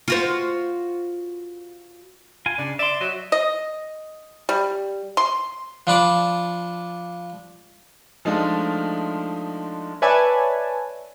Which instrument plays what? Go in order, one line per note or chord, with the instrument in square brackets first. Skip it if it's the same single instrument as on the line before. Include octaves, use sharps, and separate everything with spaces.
[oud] F4 F#4 C5
[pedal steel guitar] F4 G#5
[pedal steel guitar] C#3 [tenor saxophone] D4
[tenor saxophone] D5 [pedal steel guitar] E5 C6
[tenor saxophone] F#3 [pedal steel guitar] D#5 E5
[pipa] D#5
G3
C6
[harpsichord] F3 D4 B5 D6
[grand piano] F3 G#3 A3 D4 D#4 F4
[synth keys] B4 C#5 D5 E5 G#5 A5